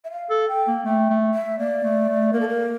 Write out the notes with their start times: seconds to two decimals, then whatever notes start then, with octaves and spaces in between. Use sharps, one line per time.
0.04 E5
0.11 F5
0.30 A4
0.48 G5
0.67 A#3
0.85 A3 G5
1.10 A3
1.34 E5
1.59 A#3 D5
1.84 A3
2.09 A3
2.33 A#3 A#4
2.40 A4
2.49 A#4